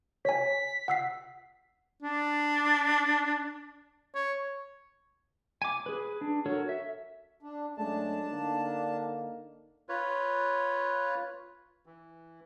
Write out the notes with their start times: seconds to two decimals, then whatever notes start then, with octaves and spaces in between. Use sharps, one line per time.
0.25 C#5 G#5 B6
0.88 F#5 E6 C7
2.03 D4
4.15 C#5
5.62 G#5 D6
5.86 G#4 B4
6.21 D4
6.46 F#4 A4 A#4 C#5
6.69 E5
7.43 D4
7.77 F#2 G#3 A3 D4 A5
8.31 D3 A#3 D#4
9.89 F4 B4 C#5
11.86 E3